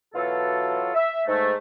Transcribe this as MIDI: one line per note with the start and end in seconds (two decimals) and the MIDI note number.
0.15 0.89 47
0.15 0.89 52
0.15 0.89 54
0.15 0.89 65
0.15 0.89 69
0.95 1.21 76
1.28 1.54 44
1.28 1.54 57